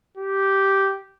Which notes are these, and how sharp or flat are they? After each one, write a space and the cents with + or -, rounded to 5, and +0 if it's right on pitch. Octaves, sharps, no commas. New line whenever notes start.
G4 -10